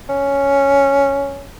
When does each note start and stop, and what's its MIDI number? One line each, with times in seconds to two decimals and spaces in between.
0.09 1.49 61